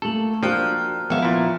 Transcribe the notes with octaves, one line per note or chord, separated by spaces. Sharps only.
A3 A#3 A4 A5 F#7
F3 A#3 D4 F#4 G5 A#5 F6 F#6
G#1 F3 B3 C#4 E5 F5 C#7
A#2 E4